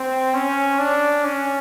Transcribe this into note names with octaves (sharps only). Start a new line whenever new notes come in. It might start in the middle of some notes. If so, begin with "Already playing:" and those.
Already playing: C4
C#4
D4
C#4